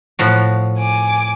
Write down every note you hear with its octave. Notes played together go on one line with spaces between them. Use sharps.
A2 F3 F#4
G#5 D6